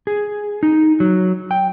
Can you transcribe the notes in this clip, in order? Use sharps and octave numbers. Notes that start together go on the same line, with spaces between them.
G#4
D#4
F#3
G5